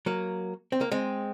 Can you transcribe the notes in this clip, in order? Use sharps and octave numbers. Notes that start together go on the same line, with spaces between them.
F#3 A#3
C4
A#3
G#3 C4